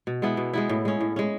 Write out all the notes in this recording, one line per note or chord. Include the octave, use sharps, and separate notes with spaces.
B2
G#3 B3 E4
B2
G#3 B3 E4
A2
G#3 C#4
A2
G#3 C#4